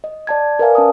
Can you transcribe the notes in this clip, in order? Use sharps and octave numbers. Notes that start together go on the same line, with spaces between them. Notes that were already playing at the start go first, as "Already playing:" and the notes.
D#5
D5 A5 G#6
A#4 B4 D5 E5 F5 G#5
C#4 A5 D#6